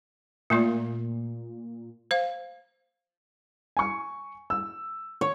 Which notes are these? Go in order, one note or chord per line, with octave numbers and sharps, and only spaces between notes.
A#2 A3 A#3 F4
C5 F5
G#5 C#6
E6
C#5